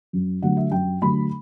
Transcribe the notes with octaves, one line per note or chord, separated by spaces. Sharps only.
F#2
D3 F#3 A3 F#5
E5
F#2 G5
D3 F#3 A3 B5